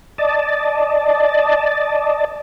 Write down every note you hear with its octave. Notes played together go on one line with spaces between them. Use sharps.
D5 D#5 A5